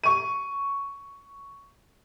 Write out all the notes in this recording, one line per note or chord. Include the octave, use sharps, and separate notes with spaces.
C#6 D#7